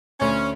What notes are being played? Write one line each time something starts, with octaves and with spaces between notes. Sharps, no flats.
D2 C#4